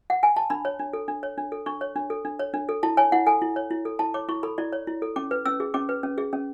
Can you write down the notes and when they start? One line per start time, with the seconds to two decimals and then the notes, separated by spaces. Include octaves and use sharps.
0.10 F#5
0.23 G#5
0.36 A5
0.50 D4 B5
0.65 C#5
0.79 D4
0.93 A4
1.08 D4
1.23 C#5
1.38 D4
1.52 A4
1.66 D4 C#6
1.81 C#5
1.96 D4
2.10 A4
2.25 D4
2.39 C#5
2.54 D4
2.69 A4
2.83 E4 A5
2.97 C#5 G#5
3.12 E4 F#5
3.26 A4 G#5
3.42 E4
3.56 C#5
3.71 E4
3.85 A4
3.99 E4 A5
4.14 C#5 D6
4.29 E4 C#6
4.43 A4 B5
4.58 E4 D5
4.73 C#5
4.87 E4
5.02 A4
5.16 C#4 D6
5.31 B4
5.45 C#4 E6
5.60 G#4
5.74 C#4 D6
5.89 B4
6.03 C#4
6.18 G#4
6.33 C#4